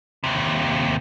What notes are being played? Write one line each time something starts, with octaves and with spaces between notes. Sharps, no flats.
D#2 C3